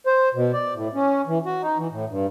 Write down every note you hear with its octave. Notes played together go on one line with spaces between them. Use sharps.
C5
B2
D5
A2
C#4
E3
F#4
D#4
E3
A2
G2